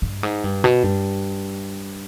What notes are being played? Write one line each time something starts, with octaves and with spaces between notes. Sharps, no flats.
G2
G#2
G2
B2
G2